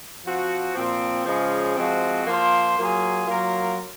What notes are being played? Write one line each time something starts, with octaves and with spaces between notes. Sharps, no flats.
F3 C4 F#4
A#2 F3 C4
C#3 F3 G#3 C#4
F3 G#3 C4 F#4
F3 A#3 F4 C5
F#3 A#3 F4 G#4
F#3 A#3 F4 A#4